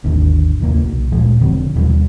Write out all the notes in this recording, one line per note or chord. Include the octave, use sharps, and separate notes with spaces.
G#1 D#2 D3
D#2 C3 A#3
B1
D2 A#2 F3 G#3
E1 D3 C4
D#2 B2 G3